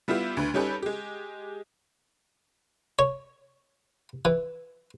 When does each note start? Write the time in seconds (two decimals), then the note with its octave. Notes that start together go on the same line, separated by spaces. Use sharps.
0.08 G3 B3 E4 F4 G4
0.37 D2 D3 B4
0.54 G3 C#4 D#4 G4 A4 B4
0.82 G#3 G4
2.99 C#5
4.25 E3